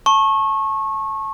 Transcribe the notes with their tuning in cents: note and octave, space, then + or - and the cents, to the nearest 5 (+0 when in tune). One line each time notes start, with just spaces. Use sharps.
A5 +0 C#6 -25